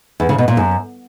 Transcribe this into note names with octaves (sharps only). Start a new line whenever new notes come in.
E2
C#3
B2
A#2
F#2